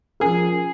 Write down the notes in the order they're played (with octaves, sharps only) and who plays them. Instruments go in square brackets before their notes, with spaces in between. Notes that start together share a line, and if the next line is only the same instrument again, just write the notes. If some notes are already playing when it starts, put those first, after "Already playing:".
[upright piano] F3 C#4 A#4 [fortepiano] G#4